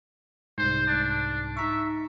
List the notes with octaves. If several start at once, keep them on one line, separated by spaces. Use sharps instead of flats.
C2 G#2 C5
D4
D#4 E5 A#5 C#6